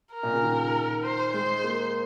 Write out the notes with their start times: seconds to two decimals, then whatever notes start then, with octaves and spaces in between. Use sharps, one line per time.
0.13 A#4
0.23 A#2
0.33 C#3
0.43 D#3
1.04 C5
1.33 G#3 C5
1.64 A#3